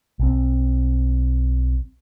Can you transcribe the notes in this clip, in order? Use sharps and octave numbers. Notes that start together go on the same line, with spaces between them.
B1 C4